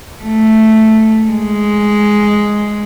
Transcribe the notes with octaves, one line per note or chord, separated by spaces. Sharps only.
A3
G#3